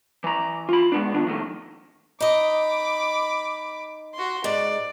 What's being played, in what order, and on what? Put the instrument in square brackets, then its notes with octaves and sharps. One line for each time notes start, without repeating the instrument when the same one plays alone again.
[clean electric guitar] E3 A#5
F4 B5
G#3 B3 D4
D#3 B3 D4 F4
F2 A2 D#3 G3 A3
[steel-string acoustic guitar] D#4 D#5 [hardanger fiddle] B5 D6
[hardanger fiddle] F#4 C6
[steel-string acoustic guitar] G#2 [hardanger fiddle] D5